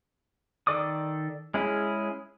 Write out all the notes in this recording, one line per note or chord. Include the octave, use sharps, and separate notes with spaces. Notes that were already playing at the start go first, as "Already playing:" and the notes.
D#3 A4 D5 D6 D#6
G#3 C#4 E4 G#4